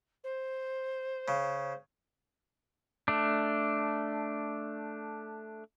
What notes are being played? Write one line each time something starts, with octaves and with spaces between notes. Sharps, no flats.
C5
C#3
A3 D4